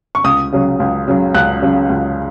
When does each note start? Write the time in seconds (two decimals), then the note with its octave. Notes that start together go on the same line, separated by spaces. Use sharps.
0.15 C#6
0.24 C#2 D#6
0.53 C#3 F#3
0.80 C#2
1.08 C#3 F#3
1.34 C#2 F#6
1.62 C#3 F#3
1.90 C#2